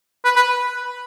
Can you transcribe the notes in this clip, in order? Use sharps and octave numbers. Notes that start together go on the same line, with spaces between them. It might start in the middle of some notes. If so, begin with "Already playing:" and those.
B4
B4